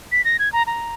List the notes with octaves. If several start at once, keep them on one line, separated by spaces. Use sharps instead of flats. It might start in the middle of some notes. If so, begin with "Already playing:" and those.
B6
A#6
G#6
A#5
A#5